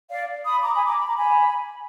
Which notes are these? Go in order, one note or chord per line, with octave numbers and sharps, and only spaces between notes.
D5 F5
B5 D#6
A#5 D6
G#5 B5
A#5 D6
B5
A#5
G#5 B5